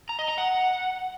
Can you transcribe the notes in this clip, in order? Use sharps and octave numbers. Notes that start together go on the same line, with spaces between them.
A#5
D#5
A#5
F#5